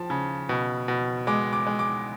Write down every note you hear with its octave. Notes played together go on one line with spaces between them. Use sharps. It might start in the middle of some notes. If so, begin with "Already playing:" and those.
Already playing: F3 A5
C#3
B2
B2
G#3 D6
D6
G#3
D6